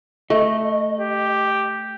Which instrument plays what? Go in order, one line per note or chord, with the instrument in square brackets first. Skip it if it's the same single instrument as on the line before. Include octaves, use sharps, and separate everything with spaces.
[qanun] A3 [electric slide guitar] D#5
[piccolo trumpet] G4